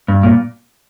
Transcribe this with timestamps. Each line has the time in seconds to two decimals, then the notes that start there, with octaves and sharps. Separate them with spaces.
0.08 G2
0.23 A#2